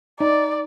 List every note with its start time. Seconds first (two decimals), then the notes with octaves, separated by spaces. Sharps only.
0.20 D#4 D5